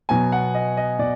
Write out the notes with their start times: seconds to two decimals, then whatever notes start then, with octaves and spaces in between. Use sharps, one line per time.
0.09 B2 F#3 B3 G#5
0.32 F#5
0.55 D#5
0.77 D#5
0.99 B2 D5